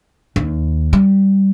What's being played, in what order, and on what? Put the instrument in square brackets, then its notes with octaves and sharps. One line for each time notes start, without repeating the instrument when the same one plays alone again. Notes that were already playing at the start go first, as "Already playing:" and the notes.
[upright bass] D#2
G3